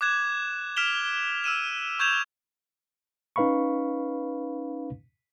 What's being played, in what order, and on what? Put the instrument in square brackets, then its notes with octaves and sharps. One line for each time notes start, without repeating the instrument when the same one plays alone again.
[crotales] D6 F#6 G#6 E7
F6 B6 D7 E7 F7 G7
E6 F6 D#7 E7
C#6 G6 G#6 E7 F7
[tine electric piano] C#4 D#4 B4 F5 B5 C#6